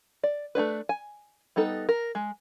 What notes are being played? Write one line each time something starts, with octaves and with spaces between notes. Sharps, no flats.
D5
A3 C4 D4 B4
G#5
G3 B3 D#4 A4
A#4
G#3